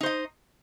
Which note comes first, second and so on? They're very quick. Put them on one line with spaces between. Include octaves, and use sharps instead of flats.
D#4 C5 D#5